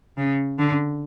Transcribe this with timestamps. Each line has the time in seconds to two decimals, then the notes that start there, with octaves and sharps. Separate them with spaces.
0.17 C#3
0.59 D3